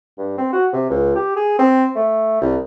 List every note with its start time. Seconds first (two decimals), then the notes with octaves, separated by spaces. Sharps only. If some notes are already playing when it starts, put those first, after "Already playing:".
0.18 G2
0.38 C4
0.53 F#4
0.73 C3
0.90 C#2
1.15 G4
1.36 G#4
1.59 C4
1.96 A3
2.41 C2